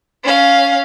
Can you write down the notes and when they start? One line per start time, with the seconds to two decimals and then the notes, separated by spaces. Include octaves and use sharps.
0.24 C#4 F5